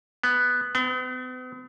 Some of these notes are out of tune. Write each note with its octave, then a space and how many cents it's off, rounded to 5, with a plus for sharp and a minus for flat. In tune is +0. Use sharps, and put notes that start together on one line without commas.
B3 +0
B3 +45